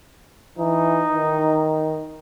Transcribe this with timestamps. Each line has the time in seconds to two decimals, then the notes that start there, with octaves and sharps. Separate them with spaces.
0.58 E3 D#4
1.14 D#3